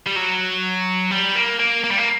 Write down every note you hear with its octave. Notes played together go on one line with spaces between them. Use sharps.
G3
F#3
G3
A#3
A#3
A#3
G3
A#3